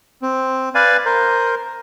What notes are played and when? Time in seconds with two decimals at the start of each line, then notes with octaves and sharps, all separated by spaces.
0.22 C4
0.75 B4 D5 F5 G#5
1.05 A#4 C5